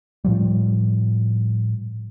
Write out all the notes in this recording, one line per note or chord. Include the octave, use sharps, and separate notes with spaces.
A2 F3 G3